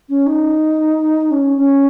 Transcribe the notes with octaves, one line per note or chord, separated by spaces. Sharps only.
C#4
D#4
C#4
C#4